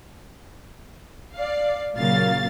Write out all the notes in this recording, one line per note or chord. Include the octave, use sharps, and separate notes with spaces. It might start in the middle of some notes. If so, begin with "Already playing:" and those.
D5 F5
A#2 C#3 F#3 A#3 F5 A6